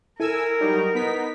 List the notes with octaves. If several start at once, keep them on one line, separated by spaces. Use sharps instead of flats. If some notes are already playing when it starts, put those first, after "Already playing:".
E4 A4 A#4 G#5 E6
F#3 G3 D#4
B3 D#4 B6